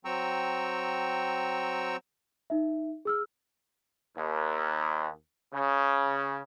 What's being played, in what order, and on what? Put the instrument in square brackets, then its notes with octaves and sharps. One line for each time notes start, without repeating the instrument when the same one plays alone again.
[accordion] F#3 C4 G5 A#5 C#6 E6
[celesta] D#4 E5
G#4 E6 F6
[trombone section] D#2
C#3